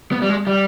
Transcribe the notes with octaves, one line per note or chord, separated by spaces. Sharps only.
B3
G3
G#3
G3